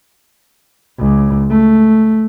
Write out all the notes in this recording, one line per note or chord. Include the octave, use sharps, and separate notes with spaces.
C#2
A3